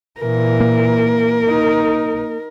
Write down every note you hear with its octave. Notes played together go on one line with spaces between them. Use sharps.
A#2 E3 A#4
A#3
D#4